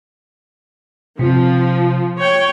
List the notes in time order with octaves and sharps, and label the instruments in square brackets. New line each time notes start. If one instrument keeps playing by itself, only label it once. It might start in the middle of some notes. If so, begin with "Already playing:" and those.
[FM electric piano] C3 [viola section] F3
[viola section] C#5 G5